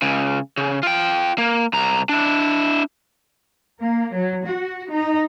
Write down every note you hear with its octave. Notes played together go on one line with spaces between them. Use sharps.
C#2 C#3
C#3
F4 G5
A#3
C2 A#5
D4 E4
A#3
F#3
F#4
D#4